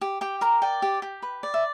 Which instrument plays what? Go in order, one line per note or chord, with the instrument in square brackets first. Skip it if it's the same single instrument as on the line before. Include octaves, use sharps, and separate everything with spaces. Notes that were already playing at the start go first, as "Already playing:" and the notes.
[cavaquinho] G4
G4 G5
A#4 A#5
D5 G5
G4
G4
B4
D5
E5